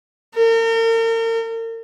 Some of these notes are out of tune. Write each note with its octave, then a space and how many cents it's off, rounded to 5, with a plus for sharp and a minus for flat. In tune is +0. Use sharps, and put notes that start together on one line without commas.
A#4 -40